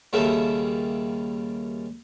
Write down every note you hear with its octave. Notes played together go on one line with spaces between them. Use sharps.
D#2 C#3 G3 A#3 A4 E5